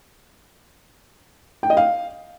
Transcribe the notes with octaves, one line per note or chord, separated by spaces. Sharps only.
G5
D#5
F5